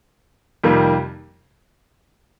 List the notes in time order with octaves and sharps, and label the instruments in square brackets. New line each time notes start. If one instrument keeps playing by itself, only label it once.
[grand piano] F2 C3 D#3 G3 A#3